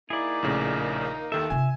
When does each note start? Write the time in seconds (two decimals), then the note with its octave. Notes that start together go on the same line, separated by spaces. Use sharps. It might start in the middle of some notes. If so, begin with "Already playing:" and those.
0.10 A#3 D#4 E4 G#4 D5
0.43 A#1 A2 C#3
1.32 D#2 D#3 A4 E5
1.50 C3 F4 G#5